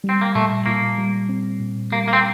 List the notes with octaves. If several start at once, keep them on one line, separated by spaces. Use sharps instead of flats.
G3
C4
A#3
A#2 A3
A#2 A#3
G3
C4
A#2
G3 A#3
A#3
C4